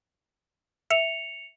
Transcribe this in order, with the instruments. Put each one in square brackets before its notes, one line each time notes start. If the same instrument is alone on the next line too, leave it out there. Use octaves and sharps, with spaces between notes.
[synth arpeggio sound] E5 [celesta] C#7 F7